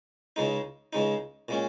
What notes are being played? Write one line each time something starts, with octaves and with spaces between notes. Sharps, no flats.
C#2 C#3 G#3 D#4
C#2 C#3 G#3 D#4
A#2 G#3 C#4